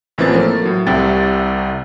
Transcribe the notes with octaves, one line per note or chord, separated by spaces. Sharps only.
A1 E3 F3 A#3 C4 A6
A3 A#3
A2 F#3
C2 C3 E4 G5 A6